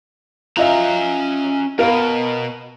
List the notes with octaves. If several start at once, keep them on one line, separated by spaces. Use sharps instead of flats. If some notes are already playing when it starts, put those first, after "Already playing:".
C#4 F4 D#5 E5 A#5
B2 A#4 F5